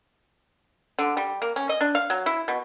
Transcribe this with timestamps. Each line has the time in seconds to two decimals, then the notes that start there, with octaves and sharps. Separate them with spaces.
0.99 D3
1.17 G3
1.42 A#3
1.56 C#4
1.69 D#5
1.81 D4
1.95 F5
2.10 F#3
2.26 E4
2.48 B2